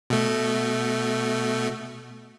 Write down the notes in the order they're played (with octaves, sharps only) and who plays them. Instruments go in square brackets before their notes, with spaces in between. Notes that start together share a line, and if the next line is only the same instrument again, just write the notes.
[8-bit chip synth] B2 A3